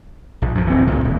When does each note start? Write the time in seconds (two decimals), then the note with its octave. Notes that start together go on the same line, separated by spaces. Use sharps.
0.42 A#1
0.55 F#2 F3
0.70 D1 D2 E3 C4
0.87 C#2 A#2
1.04 D#1